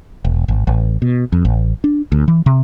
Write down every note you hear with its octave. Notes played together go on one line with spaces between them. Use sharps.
E1
G#1
A1
B2
F2
A1
D4
D2
E3
C3